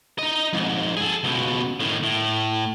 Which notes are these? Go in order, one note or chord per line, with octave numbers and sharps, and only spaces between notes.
D#4 D#5
F2 G#2
G#4 A4
C#2 B2
A2 D#3
A2